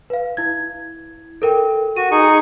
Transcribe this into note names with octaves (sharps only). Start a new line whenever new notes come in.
B4 F5
E4 G#6
A4 A#4 G5
F#4 D#7
D#4 G#4 C#6